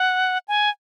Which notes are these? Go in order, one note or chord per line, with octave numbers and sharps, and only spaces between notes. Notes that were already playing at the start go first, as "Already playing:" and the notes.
Already playing: F#5
G#5